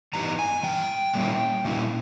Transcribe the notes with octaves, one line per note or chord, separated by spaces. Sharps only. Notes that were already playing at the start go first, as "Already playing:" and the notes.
G2 E3 G3 B3 D#4 A#5
G#5
G2 E3 G5
A#2 G3 A#3 C#4 E4
A#2 G3 A#3 C#4 E4